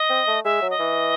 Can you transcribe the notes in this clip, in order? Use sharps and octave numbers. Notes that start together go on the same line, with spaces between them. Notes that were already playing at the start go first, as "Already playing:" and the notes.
Already playing: D#5
C4
A3
G#3 E5
F#3
D#5
E3